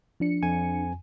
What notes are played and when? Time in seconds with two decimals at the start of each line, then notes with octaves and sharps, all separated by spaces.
0.20 F3 D4 C#7
0.43 F2 G#5